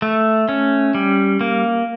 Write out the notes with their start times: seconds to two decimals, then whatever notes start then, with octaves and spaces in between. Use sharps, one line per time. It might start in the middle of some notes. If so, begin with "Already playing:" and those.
0.02 A3
0.49 C#4
0.95 G3
1.41 A#3